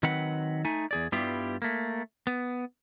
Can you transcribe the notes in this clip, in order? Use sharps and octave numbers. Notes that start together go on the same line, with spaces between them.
D#3 F#3 C4 B4 F#5
A3 D#4 G#5
E2 G#4 D5
G2 G3 B3 E4 F4 G4
A3 A#3
B3